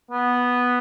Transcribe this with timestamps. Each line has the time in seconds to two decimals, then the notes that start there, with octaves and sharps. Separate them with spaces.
0.11 B3